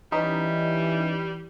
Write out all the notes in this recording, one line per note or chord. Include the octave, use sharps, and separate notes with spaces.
E3 G3 C#4 D#4 G4 B4